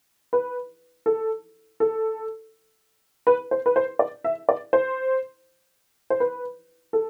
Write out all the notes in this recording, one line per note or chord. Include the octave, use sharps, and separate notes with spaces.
B4
A4
A4
B4
C5
B4
C5
D5
E5
D5
C5
C5
B4
A4